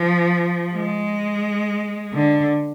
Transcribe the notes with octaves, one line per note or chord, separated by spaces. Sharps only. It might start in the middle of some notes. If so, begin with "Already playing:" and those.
Already playing: F3
G#3
D3